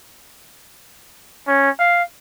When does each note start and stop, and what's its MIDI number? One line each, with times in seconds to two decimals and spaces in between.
1.47 1.70 61
1.79 2.03 77